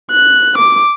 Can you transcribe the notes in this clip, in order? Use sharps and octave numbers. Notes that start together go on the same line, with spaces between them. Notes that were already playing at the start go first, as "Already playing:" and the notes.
F#6
D6